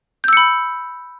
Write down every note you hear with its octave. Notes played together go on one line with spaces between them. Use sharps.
B5 E6 G6 C#7